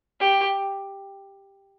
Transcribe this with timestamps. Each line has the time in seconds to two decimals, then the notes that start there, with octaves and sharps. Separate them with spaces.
0.20 G4